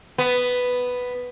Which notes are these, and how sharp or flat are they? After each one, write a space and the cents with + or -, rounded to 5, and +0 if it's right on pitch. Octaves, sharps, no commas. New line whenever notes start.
B3 +5